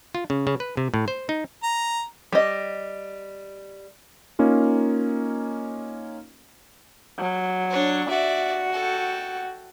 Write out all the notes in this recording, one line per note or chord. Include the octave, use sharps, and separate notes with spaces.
F4
C#3
C#3
B4
C3
A2
C5
D#4
A#5
G3 D#5
A#3 C#4 D#4 F4
F#3
D4 C#5
F#4 D5 E5
A4 G5